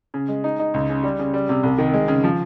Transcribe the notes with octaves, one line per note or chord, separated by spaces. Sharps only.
C#3
G#3
D#4
D#4
C#2
C#3
G3
C#3
G3
C3
C2
D#3
G#3
C#3
F3